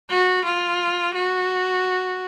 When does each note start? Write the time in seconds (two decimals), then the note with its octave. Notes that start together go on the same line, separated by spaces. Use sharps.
0.10 F#4
0.45 F4
1.15 F#4